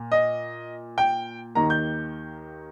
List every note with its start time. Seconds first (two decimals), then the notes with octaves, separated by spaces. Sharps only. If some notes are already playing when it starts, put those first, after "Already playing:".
Already playing: A#2
0.12 D#5
0.98 G5
1.55 D#2 D#3 A#3 A#5
1.70 G6